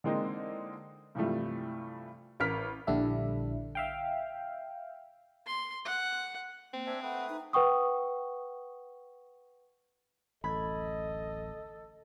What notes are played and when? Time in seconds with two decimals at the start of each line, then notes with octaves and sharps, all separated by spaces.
0.04 D3 E3 G#3 A#3 C4 D#4
1.15 G2 C3 E3 F3 G3 A3
2.40 A1 A#4 F6 B6
2.87 A#1 D3 G3 D4 E4 E5
3.75 E5 F5 G5
5.47 C6
5.86 F#5
6.74 A#3 C4
6.87 D4 C5 E5 G#5
7.03 A3 B4 F#5 G5 D#6
7.29 D#4
7.53 B4 F#5 G5 C#6 D#6
10.44 D1 A1 A4 D#5 B5 G#6